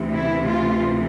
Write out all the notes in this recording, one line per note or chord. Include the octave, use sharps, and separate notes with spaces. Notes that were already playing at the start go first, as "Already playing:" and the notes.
Already playing: D2 C3 E3
E4
F4